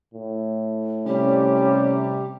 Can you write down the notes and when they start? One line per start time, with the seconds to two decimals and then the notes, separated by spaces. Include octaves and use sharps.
0.14 A2
1.07 C3 G3 C#4 G4